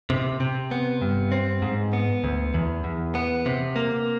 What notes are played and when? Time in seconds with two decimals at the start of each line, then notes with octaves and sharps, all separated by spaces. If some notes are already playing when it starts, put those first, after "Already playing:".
0.10 C3
0.40 C3
0.71 B3
1.02 G2
1.32 C4
1.62 G#2
1.93 B3
2.24 D2
2.54 E2
2.84 E2
3.15 B3
3.46 C3
3.76 A#3